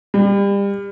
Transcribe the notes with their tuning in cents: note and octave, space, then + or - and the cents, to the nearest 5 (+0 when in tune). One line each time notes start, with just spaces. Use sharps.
G3 +30